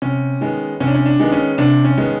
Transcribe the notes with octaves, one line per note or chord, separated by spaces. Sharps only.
C3 C#4
D#3 G#3 B3
C3 C#4
D4
C#4
D4
D#3 G#3 B3
C#4
C3 D4
C#4
D#3 G#3 B3